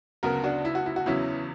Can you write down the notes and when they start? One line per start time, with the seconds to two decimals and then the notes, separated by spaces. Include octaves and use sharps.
0.23 D2 C#3 F#3 B3 F#4 A#4
0.44 D4 F#4
0.65 E4
0.75 F#4
0.86 E4
0.96 F#4
1.06 E2 C#3 F#3 B3 C#4 E4